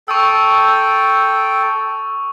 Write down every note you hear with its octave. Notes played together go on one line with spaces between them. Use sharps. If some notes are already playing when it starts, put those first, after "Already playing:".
A4 G5 C#6 D#6 E6